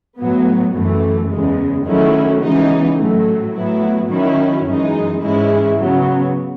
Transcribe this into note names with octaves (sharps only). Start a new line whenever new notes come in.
A2 F#3 B3
F#2 E3 A3
E2 C#3 G#3
D#3 F#3 A3 C#4 E4
C#3 E3 G#3 B3 D#4
A2 F#3 A3
A2 F#3 B3 E4
D#3 F#3 C#4 E4
F#2 E3 G#3 D#4
G#2 E3 G#3 C#4 E4
C#3 F#3 B3